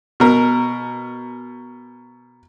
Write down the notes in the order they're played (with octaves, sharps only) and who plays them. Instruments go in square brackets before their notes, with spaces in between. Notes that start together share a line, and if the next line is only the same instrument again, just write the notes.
[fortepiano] B2 A#4